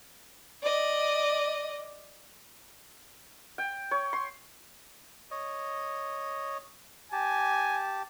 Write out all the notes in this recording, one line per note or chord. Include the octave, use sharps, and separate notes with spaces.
D5 D#5
G5
C#5
C6
C#5 D#5
G4 G#5 A5